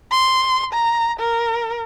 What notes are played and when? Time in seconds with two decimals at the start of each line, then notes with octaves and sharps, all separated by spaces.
0.12 C6
0.74 A#5
1.20 A#4